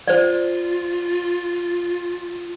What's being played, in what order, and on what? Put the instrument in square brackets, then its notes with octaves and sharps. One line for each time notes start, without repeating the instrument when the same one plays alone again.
[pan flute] F4 [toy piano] C5 D5